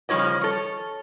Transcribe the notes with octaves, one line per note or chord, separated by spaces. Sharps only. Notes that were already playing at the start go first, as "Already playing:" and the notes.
C#3 F3 G3 F#4 C#5 D#5
A4 C#5